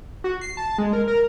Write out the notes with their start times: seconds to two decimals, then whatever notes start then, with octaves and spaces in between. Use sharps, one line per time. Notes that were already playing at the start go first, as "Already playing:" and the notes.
0.24 F#4
0.41 C7
0.57 A5
0.78 G#3
0.93 A#4
1.08 A#4